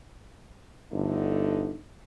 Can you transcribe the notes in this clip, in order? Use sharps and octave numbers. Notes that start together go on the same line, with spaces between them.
G1 D3 A3 D#4